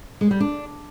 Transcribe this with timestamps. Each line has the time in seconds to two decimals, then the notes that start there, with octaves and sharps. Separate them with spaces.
0.21 G#3
0.31 G3
0.40 D4